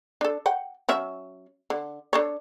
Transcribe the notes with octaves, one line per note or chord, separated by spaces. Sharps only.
D4 A4
F#5 G5
F#3 C#4 E5
D3
D4 A4 C#5